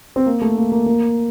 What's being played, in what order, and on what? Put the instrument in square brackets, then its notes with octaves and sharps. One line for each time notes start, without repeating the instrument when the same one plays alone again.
[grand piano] C4
A#3
A3
A#3
A#3
A#3